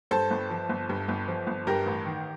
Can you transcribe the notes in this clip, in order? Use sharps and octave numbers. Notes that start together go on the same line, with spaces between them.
G2 A4 C5
G1
F3
G1
G2
G1
F3
G1
G2 G4 A#4
A1
D#3